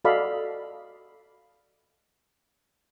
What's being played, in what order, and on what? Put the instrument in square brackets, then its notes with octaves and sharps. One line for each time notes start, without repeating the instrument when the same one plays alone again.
[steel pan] F#4 A4 D5 D#5 F5 B5